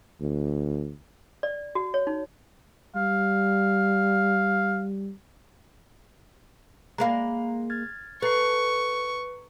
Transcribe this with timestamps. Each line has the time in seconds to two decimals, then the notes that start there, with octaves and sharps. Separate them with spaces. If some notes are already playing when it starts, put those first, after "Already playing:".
0.21 D2
1.43 D5
1.75 F#4
1.94 C#5
2.07 D#4
2.96 G3 F5
6.98 G#3 A#3 F5 A#5 B5
7.70 F6 G#6 A6
8.22 A4 B4 A#5 C#6 C7